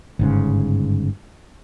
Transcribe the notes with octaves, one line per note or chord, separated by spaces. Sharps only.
G1 G#2 C#3